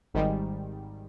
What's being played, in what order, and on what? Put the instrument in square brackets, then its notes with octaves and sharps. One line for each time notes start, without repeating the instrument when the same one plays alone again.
[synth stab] G#1 G#2 D#3 G3